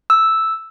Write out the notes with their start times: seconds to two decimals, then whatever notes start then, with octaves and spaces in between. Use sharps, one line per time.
0.10 E6